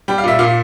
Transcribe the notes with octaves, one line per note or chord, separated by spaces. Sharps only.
G3 G5
F5
A#2 E5
A#2 F5